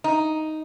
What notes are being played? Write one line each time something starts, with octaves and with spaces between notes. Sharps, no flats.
D#4